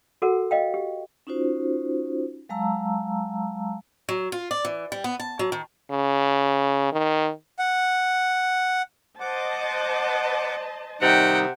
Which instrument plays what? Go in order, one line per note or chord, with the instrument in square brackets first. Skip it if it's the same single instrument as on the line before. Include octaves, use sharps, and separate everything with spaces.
[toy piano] F#4 A4 A#4 F#5
D#5 F5 G5
G4
[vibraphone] C#4 D#4 F4 F#4 C5
F#3 G#3 F5 A5 A#5 E6
[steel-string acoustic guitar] F#3
F4
D5
E3
G3
B3
A5
F#3
D#3
[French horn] C#3
D#3
[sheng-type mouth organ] F#5
[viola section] C5 D#5 A5 [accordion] F#5 D6
[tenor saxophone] C3 [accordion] D#3 G3 D#4 [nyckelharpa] F#5 G5